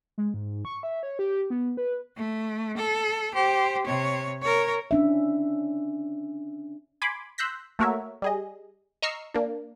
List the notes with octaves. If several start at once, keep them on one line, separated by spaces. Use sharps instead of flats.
G#3
G#2
C#6
E5
C#5
G4
B3
B4
A3
A4
G4 C5
C3 C#5
A#4 C#5
C#4 D4 E5
G#5 B5 C6 D6
C6 E6 F#6 G6 A#6 B6
A3 A#3 F#4 A#4 C#5 E5
G3 G#4 D#5
D#5 A#5 C#6 E6 F6 C7
A#3 D4